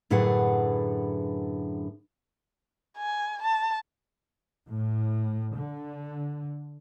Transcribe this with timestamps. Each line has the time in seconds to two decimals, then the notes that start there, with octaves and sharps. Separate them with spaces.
0.10 F#2 A2 D3 G#4 B4 F#5
2.98 G#5
3.42 A5
4.69 A2
5.56 D3